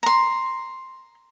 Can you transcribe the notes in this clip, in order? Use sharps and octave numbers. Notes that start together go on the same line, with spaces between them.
A#5 C6